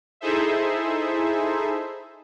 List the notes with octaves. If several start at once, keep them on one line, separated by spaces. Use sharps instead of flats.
D#4 E4 G#4 A4 C5 E5